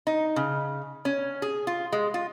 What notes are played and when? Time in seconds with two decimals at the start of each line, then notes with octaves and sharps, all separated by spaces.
0.07 D#4
0.36 C#3
1.05 C#4
1.42 G#4
1.67 F4
1.93 G#3
2.14 F4